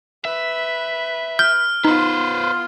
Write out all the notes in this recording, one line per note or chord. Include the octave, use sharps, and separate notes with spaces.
B4 E5
F6 G6
B3 D#4 F4 B4 C5